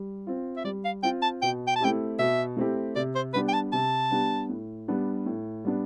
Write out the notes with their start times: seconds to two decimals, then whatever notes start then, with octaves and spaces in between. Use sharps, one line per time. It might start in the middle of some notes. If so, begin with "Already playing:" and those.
Already playing: G3
0.27 C4 F4
0.57 E5
0.64 G3 D5
0.85 F5
1.03 C4 F4 G5
1.22 A5
1.42 B2 G5
1.68 G5
1.76 A5
1.80 A3 C4 E4 G4 G5
2.19 B2 E5
2.57 A3 C4 E4 G4
2.96 C3 D5
3.15 C5
3.34 G3 B3 D4 G4 B4
3.48 G5
3.53 A5
3.73 C3 A5
4.11 G3 B3 D4 G4
4.49 A2
4.88 G3 B3 D4
5.26 A2
5.65 G3 B3 D4